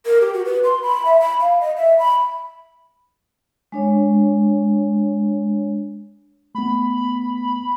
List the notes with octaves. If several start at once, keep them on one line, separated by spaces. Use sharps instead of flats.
A#4
G4
F#4
B4
C6
B5
E5
B5
F5
D#5
E5
B5
G#3 D4 C#5
A3 B3 B5